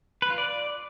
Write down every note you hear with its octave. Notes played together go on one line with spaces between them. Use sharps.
B4
F4
D5